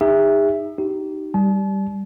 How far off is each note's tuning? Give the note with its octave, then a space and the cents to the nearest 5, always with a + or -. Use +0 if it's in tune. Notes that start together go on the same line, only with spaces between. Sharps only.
D#4 +0 G#4 -45 E5 +0
D#4 +0 G4 -30
G3 +0 A5 -45